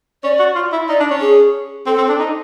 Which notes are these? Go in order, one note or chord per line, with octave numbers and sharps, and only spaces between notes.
C#4 D5
F#4
F4
E4
D#4 D5
D4
C#4
G#4
C4 A4
C4
D4
D#4